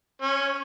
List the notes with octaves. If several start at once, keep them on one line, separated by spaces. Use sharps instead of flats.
C#4